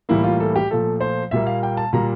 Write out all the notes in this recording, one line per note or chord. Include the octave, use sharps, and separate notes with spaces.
A2 E3 G3 A#3 E4
F4
A4
G4
A#2 F3 A3 A4
C5
A#2 G3 A#3 E5
F5
G5
A5
A#2 G3 A#3 A#5